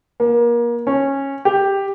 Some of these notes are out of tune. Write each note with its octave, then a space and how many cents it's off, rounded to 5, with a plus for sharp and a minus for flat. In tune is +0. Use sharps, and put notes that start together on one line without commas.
A#3 +30
C#4 -15
G4 +5